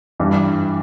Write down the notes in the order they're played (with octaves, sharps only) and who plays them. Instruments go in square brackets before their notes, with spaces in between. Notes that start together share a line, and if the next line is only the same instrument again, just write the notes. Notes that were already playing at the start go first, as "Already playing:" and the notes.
[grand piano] G2 E3 G3